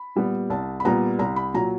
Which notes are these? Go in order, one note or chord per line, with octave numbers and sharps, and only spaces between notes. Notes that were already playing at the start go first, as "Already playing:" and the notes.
Already playing: B5
A#2 G3 B3
C2 A5
B5
A#2 G3 B3 A#5
C2 A#5
B5
A#2 F#3 A#5